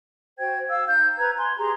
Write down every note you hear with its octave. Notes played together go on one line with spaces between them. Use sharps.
F#4 C5 G5 G#6
F5 E6
D#4 G6
B4 A#5 G#6
G#5 C6
G4 G#4 A#5 C6